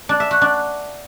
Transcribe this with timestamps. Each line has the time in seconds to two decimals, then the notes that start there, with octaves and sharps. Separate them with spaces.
0.09 D4
0.20 E5
0.31 F#4
0.41 D4